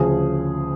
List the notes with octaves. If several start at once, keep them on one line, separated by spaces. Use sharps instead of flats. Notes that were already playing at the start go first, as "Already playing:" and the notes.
Already playing: D2 C#3 F3 G#4